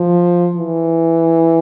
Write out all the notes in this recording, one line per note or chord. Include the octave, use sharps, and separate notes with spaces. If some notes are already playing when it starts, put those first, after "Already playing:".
Already playing: F3
E3